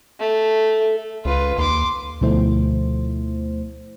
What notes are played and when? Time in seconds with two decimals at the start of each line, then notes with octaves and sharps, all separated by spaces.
0.19 A3
1.25 C#2 F4 B4
1.58 D#2 C6 D6
2.21 D2 B2 F3 A3 E4 C5